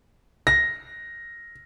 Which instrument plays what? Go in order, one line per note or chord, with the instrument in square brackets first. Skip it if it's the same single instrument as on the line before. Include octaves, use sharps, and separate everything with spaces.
[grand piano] A#6